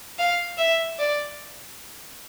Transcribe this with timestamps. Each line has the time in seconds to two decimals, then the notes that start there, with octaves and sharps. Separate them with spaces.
0.19 F5
0.58 E5
0.99 D5